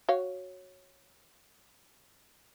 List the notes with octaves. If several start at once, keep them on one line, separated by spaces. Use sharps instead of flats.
F#4 C#5 F5